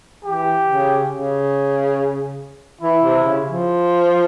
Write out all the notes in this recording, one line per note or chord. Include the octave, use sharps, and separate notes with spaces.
E3 G4
C#3
C#3
E3 E4
C3
C#3
F3